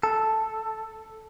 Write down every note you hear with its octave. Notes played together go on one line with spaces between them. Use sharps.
A4